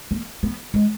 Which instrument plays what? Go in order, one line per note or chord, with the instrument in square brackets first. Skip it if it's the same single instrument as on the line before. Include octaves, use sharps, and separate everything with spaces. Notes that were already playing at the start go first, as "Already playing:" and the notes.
[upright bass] A#3
B3
G#3